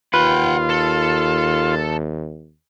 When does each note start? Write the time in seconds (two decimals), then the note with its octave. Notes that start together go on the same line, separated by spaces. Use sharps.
0.14 D#2 F4 B4 F#5 G5
0.69 A4